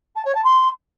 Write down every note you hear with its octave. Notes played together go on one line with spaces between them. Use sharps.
A5
C#5
A5
C6